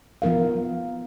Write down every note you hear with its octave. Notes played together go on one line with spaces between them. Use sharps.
F3 B3 D#4 A#4 F5